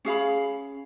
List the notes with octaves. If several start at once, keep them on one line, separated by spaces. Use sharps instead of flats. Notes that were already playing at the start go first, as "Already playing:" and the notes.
C#4 G#4 F5 B5